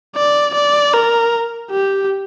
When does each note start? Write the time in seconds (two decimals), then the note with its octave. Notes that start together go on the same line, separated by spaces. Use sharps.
0.16 D5
0.54 D5
0.94 A#4
1.72 G4